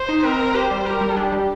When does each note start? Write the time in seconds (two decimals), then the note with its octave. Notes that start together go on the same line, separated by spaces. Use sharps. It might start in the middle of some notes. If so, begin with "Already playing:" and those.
Already playing: C5
0.09 D#4
0.24 C4 A#4
0.39 C4
0.55 G4 C5
0.71 G3
0.86 G4 A#4
1.01 G3
1.16 D4 G4
1.32 G3